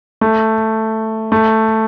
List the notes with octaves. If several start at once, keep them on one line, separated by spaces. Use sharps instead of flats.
A3
A3